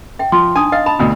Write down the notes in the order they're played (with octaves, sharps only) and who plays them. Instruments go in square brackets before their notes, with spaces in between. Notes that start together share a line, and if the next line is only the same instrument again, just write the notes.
[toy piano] E5 G5
[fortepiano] F3 [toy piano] C6
[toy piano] D4 D#4 D#6 [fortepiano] G#5
[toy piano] D#5 [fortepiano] F5
[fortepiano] A5 [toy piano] B5
[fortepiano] D2 B2